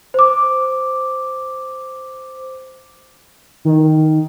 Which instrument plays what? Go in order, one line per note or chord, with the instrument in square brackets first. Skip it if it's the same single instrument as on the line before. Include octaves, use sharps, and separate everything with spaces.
[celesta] C5 D6
[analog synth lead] D#3